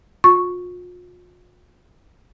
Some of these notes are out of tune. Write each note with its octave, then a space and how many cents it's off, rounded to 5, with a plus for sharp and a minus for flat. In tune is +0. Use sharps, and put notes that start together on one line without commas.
F4 +40 C#6 +0